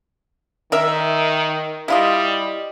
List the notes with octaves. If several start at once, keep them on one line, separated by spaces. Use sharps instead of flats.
D#3 A#4 E5
G3 E4 F4 D#5